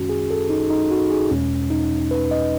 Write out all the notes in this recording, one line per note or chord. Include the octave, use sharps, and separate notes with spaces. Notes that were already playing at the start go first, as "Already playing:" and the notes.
Already playing: F#2 D#3 G#3 C#4 F#4
G#4
A4
D#4
D#4
F#4
G#4
E2 B2 G#3 C#4
D#4
B4
D#5